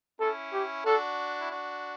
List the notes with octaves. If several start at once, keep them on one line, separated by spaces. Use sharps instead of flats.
C#4 E4 A4
G4
D4 F#4 A4
E4
D4 F#4